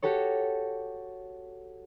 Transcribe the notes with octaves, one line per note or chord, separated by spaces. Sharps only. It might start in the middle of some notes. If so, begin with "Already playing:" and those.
F#4 G4 A4 C#5